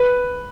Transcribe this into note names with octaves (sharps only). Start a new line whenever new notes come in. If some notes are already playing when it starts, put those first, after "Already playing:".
Already playing: B4